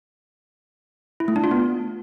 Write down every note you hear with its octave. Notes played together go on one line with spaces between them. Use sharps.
E4
A3
D4
F4
B3